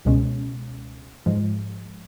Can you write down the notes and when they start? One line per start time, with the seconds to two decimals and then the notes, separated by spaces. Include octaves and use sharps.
0.05 C#2 B2 G#3 C#4
1.26 G#2 F3 G#3